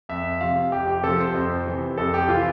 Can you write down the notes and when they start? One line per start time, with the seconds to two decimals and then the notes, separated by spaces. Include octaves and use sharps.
0.09 F2 E5
0.41 C3 F3 F5
0.72 F2 G4
0.88 G4
1.03 C3 F3 A4
1.20 C5
1.34 F2
1.67 C3 E3
1.98 F2 A4
2.14 G4
2.29 C3 E3 F4